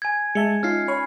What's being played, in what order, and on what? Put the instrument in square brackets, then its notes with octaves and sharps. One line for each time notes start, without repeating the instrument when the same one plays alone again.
[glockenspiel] G#5 G#6
[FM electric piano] G#3 E5 A5 [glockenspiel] C#7
[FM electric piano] C#4 D#4 F4 [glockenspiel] F6 C7
[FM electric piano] C#5 G#5 C#6 [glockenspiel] B5